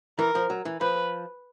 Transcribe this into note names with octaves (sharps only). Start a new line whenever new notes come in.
E3 A#4
F3
F#3
E3
F3 B4